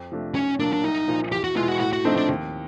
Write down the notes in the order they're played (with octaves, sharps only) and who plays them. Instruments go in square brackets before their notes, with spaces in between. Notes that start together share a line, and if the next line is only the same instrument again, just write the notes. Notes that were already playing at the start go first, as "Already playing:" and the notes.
Already playing: [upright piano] F2
C3 F3 A3 D4
[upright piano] B1 [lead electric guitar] C#4
[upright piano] A#2 F#3 A#3 [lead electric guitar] D4
[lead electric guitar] D4
[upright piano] C2 [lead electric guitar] D#4
[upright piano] A#2 F3
[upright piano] E2 [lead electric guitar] G4
[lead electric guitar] F#4
[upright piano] B2 G#3 B3 E4 [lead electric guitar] F4
[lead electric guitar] F#4
[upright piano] A2 [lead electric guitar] F#4
[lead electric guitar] F#4
[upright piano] F3 A3 C4 D#4 [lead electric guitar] D4
[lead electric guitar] D4
[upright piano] D#2